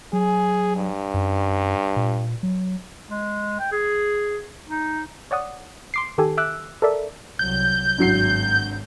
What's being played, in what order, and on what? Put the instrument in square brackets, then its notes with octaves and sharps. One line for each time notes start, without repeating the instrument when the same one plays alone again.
[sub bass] F#3 [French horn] G#4
[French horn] G2
[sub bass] F#2
A#2
F#3
[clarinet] G#3
G5
G#4
D#4
[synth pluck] C#5 D5 F#5 D#6
C6 D6 C7
D#3 G4 A4 G#5
E5 D6 E6 F#6
A4 A#4 D5 E5
[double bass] C2 F#3 [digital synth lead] G6
[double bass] G#1 [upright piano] G2 F#3 C7